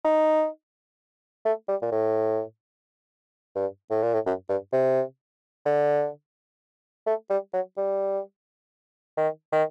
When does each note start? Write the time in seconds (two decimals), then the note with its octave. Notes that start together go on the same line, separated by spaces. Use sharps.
0.04 D#4
1.45 A3
1.68 G3
1.82 A#2
1.92 A2
3.55 G2
3.90 A2
4.02 A#2
4.14 A2
4.26 F#2
4.49 G2
4.73 C3
5.66 D3
7.06 A3
7.30 G3
7.53 F#3
7.77 G3
9.17 D#3
9.52 D#3